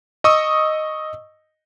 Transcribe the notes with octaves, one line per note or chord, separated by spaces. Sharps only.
D#5 C#6 D#6 E6